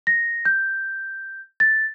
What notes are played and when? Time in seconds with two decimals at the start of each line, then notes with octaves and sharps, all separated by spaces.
0.07 A#6
0.45 G6
1.60 A6